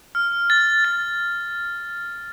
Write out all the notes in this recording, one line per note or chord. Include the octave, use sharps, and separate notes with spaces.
F6
A6
A6